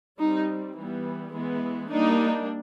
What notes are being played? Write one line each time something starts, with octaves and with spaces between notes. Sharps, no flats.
G3 C4 D#4
E3 G3 B3
E3 G#3 B3
G3 A#3 D4 D#4